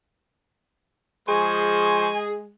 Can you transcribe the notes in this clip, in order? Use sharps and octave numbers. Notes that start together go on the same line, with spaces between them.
F3 G#3 G#4 C5 G#5 C#6